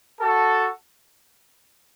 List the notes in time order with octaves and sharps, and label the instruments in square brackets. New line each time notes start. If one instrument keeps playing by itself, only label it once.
[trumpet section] F#4 A4